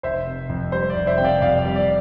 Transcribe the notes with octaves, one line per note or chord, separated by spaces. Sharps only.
F1 C5 E5
C3
F2
G3 C5
D5
F1
C5 E5
C3 G5
D5 F5
F2 D5 F5
D5
G3
D5